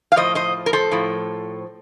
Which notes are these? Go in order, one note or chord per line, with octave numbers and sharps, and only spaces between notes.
F5
A2 F3 C5 D#5
C5 D#5
A#4
A4 C5
A2 F3